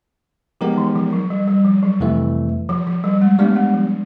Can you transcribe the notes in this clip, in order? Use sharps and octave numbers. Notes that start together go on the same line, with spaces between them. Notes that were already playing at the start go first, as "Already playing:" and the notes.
F3 G#3 B3 D#4 G4 A#4
E3
F3
F#3
G3
G3
F3
F#3
F2 C3 E3 A3
F3
F3
G3
G#3
G3 A3 B3 D4
G#3
F3